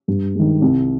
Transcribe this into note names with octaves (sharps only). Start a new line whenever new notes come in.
G2
D#3 G#3
C2